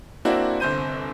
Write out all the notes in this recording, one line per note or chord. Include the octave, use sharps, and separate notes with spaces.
A#3 C4 D4 E4 F#4
G1 C2 C5 G6 D#7